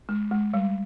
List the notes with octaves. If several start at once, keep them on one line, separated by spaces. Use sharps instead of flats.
G#3
G#3
G3